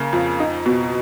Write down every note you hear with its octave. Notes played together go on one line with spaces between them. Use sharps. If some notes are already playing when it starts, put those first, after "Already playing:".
Already playing: C#3 A#3
F2
D#4
B2